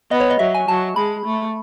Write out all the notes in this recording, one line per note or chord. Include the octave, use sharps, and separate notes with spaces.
B3 D#5
C#5
D#5
F#3 E5
G#5
F#3 A5
G#3 B5
A3